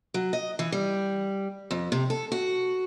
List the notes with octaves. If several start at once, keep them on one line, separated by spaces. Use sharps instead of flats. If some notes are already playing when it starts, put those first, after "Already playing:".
F#3
D#5
E3
G3
F2
C3
A4
F#4